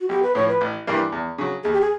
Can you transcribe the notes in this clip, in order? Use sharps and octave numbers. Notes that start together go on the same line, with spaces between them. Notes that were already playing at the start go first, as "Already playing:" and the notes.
F#4
B1 G4
B4
A2 F3 C#5
B4
A1
G2 E3 G3 A#3
E2
C#3 F#3
D#2 G#4
G4
G#4